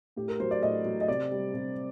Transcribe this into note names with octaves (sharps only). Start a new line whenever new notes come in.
A2 G4
A#4
F#3 C5
D5
A2 D#5
F#3
D#5
C3 D5
G3
C3